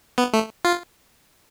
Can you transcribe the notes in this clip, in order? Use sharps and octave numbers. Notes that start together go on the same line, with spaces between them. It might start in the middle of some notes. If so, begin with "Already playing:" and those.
B3
A3
F4